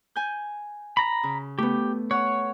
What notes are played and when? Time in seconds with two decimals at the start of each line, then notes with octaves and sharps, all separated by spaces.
0.16 G#5 G6
0.97 A#5 B5
1.23 C#3
1.59 A3 B3 G4
2.11 C#5 F#5